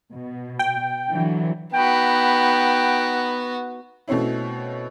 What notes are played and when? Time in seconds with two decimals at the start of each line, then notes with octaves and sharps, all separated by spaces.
0.13 B2
0.59 G5
1.10 D3 E3 F#3
1.74 B3 D#4 F#4 G5 B5
4.08 B2 A3 C4 C#4 E4